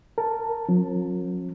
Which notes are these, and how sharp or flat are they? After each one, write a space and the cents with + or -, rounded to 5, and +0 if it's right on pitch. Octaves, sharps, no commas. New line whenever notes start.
A#4 -10 A5 +0
F3 +45 C#4 -40